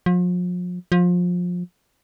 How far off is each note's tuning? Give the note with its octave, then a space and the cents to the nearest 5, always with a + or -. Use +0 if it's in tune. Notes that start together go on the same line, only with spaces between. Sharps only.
F3 +40
F3 +25